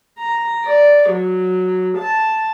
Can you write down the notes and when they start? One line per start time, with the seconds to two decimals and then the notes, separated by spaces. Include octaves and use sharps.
0.18 A#5
0.64 D5
1.10 F#3
1.97 A5